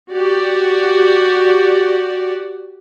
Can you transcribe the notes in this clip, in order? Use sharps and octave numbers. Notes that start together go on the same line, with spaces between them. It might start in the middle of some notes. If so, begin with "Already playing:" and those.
F#4 G4 D5